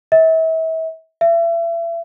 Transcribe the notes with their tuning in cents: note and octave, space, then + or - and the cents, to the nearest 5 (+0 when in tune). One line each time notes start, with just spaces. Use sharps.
E5 -35
E5 +35